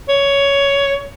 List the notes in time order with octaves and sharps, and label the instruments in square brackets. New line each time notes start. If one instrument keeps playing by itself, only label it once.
[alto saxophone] C#5